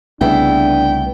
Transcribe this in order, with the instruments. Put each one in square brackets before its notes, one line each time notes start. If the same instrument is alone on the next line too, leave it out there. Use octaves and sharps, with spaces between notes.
[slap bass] C2 A3 [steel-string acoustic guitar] C#3 B3 E4 [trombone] D4 [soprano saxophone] G5